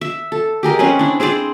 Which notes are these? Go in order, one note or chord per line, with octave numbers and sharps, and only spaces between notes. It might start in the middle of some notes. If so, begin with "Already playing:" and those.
E5
A4
G4 G#4 A#4 D#5
C4 C#4 G#4 B4
D4 E4
C4 G#4 C5 D5